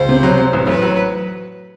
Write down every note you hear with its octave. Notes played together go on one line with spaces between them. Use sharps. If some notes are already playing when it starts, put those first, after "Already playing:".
Already playing: C#2 C5
C3
F#3
F#3
A1
A1 B4
F#3